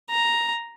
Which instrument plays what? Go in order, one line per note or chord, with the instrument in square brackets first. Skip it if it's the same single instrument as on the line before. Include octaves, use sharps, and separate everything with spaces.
[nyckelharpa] A#5